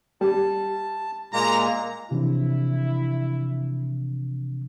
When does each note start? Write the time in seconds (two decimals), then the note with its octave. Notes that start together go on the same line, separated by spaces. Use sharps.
0.21 G3 A5
1.33 A#2 G#3 A#3 A#5
2.11 C3 E3 F3 D4 E4